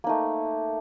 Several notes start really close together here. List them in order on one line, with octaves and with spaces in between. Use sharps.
A#3 D#4 A3